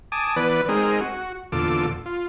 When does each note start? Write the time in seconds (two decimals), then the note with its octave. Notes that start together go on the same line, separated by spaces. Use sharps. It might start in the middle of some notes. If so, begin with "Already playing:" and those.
0.12 G#5 A5 D6 D#6
0.36 E3 B3 B4 D5
0.69 G#3 C4 D#4 G#4 A#4
1.00 F#4
1.52 E2 A#2 D3 F4 A4 D6
2.06 F4